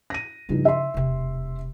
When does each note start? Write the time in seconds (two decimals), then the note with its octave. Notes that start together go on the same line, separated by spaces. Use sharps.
0.10 A#6 D#7
0.49 G2 C#3 F3 C#4 D#4
0.65 E5 C6
0.94 E1 C3